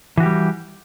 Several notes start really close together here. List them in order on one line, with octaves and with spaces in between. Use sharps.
E3 F#4 G4 G3